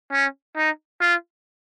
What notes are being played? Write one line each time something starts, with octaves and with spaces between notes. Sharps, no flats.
C#4
D#4
F4